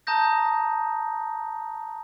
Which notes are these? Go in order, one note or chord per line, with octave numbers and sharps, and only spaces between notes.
A5 A#5 D#6 G6 A#6